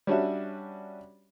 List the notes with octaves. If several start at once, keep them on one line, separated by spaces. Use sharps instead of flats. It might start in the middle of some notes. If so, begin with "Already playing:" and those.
G3 C#4 D4 F#4 E5